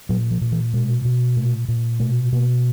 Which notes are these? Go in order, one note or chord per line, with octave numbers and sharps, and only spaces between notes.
A#2 F#3
F3
A#2
E3
B2 G#3
B2
A#2 A3
A#2
B2 A3
B2 A#3